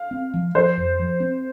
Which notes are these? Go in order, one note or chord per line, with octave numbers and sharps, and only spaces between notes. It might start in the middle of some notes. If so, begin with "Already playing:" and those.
Already playing: F5
C4
F3
F3 C5
F2
F3
C4